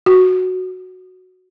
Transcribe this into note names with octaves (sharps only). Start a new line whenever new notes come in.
F#4